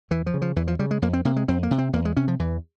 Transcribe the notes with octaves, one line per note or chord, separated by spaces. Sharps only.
E2 E3
F3
C#3
F3
E2 E3
F3
C#3 G3
G#3
F2 A#3
C4
C3 A#3
G#3
F2 C4
A#3
C3
C4
E2 A#3
G#3
C3 C#4
F3
E2 E3